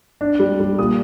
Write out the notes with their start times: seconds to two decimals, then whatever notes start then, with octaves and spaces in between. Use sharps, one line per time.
0.21 D4
0.39 G3
0.60 G3
0.78 A#2 D#6